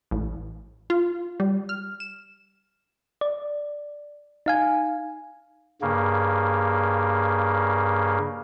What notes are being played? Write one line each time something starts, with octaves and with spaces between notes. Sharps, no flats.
A1
F4
G3
F6
E7
D5
D#4 F5 G#5
G2 C#3 A#3